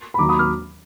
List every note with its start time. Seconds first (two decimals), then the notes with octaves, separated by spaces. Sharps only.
0.14 B5
0.19 D#2 D#3 F#3 A#5 D6
0.29 B5 D#6
0.39 D6 F6